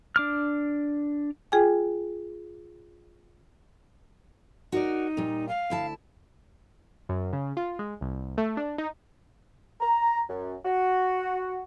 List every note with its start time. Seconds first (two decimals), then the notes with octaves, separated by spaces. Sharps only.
0.16 D4 D6 F6
1.52 F4 G#4 G5 G#5
4.72 D#4 F#4 A#4 D5
5.17 A#2 G3
5.49 F5
5.70 D2 E4 A5
7.09 F#2
7.33 C#3
7.57 F4
7.79 G#3
8.01 C2
8.38 A3
8.57 D4
8.78 D#4
9.81 A#5
10.28 F#2
10.64 F#4